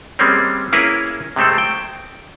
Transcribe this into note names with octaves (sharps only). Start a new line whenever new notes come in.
G3 G#3 A#3 C4 C#4
A#3 C#4 E4 G#4 A#4 B4
C3 G#3 A3 C4 A4
G5